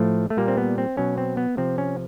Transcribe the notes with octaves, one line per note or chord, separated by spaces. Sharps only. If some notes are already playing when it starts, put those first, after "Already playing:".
Already playing: A2 F3 A3
A3
A#2 G3 A#3
C4
B3
C4
B2 F#3 C#4
C4
B3
C3 F3 C4
C#4